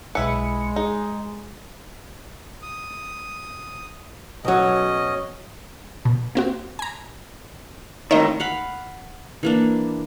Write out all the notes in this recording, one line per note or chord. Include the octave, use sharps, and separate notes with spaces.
B1 G#3 E4 B4 C#7
D#4 G#4 D#5
D#6
B1 F#3 C#4 D#5
B2
A#3 C4 F#4
G#5 A#5
A2 D#3 C#5 D#5
F5 F#5 B5
E3 A#3 D4